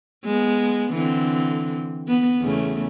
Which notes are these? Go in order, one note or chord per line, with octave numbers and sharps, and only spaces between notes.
G#3 B3
D3 E3 C4
B3
E2 C#3 A3